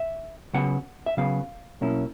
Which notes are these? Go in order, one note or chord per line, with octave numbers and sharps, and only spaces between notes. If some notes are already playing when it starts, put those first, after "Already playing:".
Already playing: E5
C#3 F#3 B3 F#5
E5
C#3 F#3 B3 F5
B2 F#3 A#3 C#4 E4